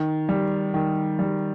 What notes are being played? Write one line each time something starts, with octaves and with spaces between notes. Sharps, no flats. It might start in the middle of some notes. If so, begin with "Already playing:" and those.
Already playing: D#3
G3
D#3
G3